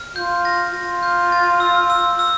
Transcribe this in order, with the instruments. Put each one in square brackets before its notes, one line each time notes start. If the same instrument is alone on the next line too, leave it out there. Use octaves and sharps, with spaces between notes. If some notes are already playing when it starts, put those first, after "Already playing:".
Already playing: [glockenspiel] F6
[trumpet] F4 [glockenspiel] G6
[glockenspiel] A#6
[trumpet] F4 [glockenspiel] A#6
[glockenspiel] G6
A6
E6
E6
E6